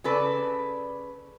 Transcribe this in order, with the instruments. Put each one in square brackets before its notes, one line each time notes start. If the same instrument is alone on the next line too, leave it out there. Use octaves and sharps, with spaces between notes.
[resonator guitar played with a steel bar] C#3 A4 B4 D5